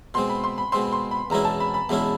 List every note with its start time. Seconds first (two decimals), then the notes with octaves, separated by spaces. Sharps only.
0.14 B2 G#3 C4 C6
0.29 B5
0.44 C6
0.58 B5
0.72 B2 G#3 C4 C6
0.93 C6
1.11 B5
1.30 E2 B2 G#3 C#4 E4 A#5
1.45 A5
1.60 B5
1.74 B5
1.89 E2 B2 G#3 C#4 E4